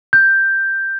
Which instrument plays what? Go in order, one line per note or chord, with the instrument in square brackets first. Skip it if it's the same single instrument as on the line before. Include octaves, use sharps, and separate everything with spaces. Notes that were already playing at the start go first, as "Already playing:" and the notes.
[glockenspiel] G6